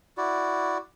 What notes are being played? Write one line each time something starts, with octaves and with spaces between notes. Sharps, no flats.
E4 F#4 D5